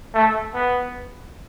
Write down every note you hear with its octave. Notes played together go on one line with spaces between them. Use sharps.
A3
B3